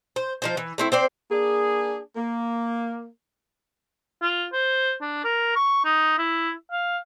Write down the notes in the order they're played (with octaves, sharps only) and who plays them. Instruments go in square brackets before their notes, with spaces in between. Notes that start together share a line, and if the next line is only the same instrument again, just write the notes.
[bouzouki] C5
F3 D#4 C5
E3
A3 C4 E4
C4 C5 D5
[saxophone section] A#3 D4 G#4
A#3
[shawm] F4
C5
D4
A#4
C#6
D#4
E4
F5